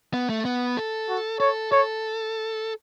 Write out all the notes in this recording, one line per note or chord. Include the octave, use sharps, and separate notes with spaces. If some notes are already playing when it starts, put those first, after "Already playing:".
B3
A3
B3
A4
F#4
A4 C#5
A4 C#5